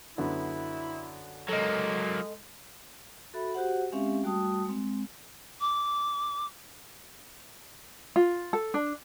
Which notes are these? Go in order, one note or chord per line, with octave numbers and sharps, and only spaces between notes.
F#2 D3 B3 E4
F#3 G#3 A#3 A4 D#5
F#4 A4 E5 B5
F#4 G4 C5 F#5
G#3 C4 C#4 G4 E5 F5
G3 A3 F#4 G5 A5 D#6
G#3 C4
D6
F4
A4
D4